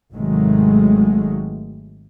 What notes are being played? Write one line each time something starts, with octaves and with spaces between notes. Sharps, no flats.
G#1 C3 D#3 F#3 G#3 A3